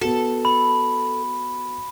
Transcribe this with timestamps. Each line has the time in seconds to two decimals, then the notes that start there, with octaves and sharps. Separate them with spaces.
0.01 B3 F#4 A4
0.45 B5